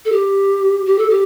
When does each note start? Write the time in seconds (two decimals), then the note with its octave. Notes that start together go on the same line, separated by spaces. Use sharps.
0.05 A4
0.12 G4
0.86 G4
0.98 A4
1.10 G4